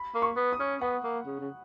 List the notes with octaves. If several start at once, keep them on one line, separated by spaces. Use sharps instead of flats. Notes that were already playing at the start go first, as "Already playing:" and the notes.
Already playing: B5
A#3
C#6
B3
D#6
C#4
B3 F#5
A#3
C#3
C#3